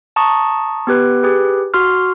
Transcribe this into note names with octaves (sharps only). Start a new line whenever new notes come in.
A5 A#5 C#6 D#6
B3 G4 B4
G4 G#4 B4
F#4 C6 F6